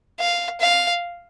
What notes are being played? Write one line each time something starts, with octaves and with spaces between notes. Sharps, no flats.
F5
F5